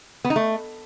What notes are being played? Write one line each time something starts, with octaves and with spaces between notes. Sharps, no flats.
B3
D#4
A3